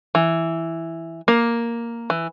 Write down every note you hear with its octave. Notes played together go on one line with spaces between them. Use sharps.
E3
A#3
E3